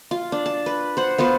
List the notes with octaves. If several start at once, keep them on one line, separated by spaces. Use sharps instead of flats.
F4
D4
A5
B4
C5 F#5
B3 F4 B4 C5